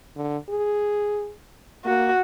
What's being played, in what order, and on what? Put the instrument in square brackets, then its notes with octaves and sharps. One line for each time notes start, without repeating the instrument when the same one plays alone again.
[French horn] D3
G#4
[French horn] A#3 [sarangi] F#4